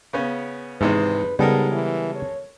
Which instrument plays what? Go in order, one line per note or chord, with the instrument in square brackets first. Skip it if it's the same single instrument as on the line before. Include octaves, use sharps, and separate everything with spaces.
[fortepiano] C#3 B3 C#4
[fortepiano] G#1 C3 G#3 [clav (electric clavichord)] G#2 E3 [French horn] B4
[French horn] G#2 [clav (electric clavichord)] C#3 G3 B3 [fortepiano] G#3 A4 A#4
[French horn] E3
C#5